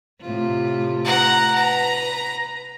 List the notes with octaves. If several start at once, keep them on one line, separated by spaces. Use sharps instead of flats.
A2 C3 F4
F#5 A#5
B4 A#5